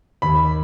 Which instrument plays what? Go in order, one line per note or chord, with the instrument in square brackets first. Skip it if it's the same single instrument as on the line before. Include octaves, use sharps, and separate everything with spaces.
[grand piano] D#2 B5